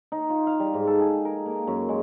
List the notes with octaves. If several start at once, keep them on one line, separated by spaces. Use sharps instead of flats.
D#4
F4
F5
G3
G#2
A4
G#4
A#4
A#3
F#2
G#3